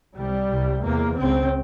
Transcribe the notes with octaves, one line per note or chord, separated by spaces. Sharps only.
C2 C3 G3
C2 C3
E2 C3 A#3
C#2 C#3 C4